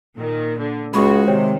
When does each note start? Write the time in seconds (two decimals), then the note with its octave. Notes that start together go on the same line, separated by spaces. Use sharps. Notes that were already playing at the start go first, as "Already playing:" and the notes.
0.17 A#2 D#3
0.58 D3
0.94 C#2 G#3 F#4 B5 C#6
1.27 C3 D#3 C5 C#5 G5